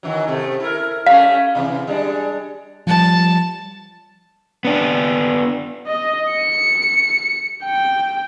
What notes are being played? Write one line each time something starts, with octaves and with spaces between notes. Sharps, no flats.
D#3 E3 F#3
A2 C3 A3
E4 A#4
G3 A3 C#4 F5
C3 E3
G3 G#3 D4
F3 G3 A5
B3 D4
D#5
C#7
G5